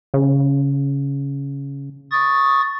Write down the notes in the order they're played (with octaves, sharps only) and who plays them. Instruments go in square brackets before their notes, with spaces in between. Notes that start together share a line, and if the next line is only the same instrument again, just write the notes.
[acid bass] C#3
[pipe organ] C#6 D#6 A6